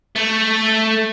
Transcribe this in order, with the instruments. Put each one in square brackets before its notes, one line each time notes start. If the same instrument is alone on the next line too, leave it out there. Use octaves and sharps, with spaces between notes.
[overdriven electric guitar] A3